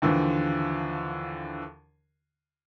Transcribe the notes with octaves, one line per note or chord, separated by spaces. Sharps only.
D#2 D3 E3 F3